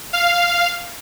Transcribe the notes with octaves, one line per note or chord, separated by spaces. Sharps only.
F5